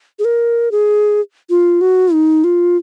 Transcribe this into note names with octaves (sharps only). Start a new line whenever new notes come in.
G#4
A#4
G#4
F4
F#4
D#4
F4